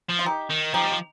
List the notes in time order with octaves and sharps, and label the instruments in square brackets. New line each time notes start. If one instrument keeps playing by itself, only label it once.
[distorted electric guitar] F3
[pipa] F4
D#4 G4
[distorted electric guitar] D#3
[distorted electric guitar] F3 [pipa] D#4 G4
[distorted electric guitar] G3
F3